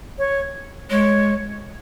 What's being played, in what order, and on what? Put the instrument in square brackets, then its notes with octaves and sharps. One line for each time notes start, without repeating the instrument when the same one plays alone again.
[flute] C#5
[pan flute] G#3 [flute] C#5